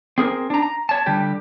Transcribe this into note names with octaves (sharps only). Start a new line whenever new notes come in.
C4 G#4 A#4
D4 A#5
A#5
C#5 A5
D3 G3 G4